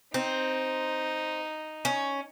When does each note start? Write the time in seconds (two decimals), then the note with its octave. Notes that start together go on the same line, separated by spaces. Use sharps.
0.14 C4 D#4
1.85 C#4